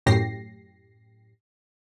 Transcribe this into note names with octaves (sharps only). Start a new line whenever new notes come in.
F#2 A2 G4 A#6 C7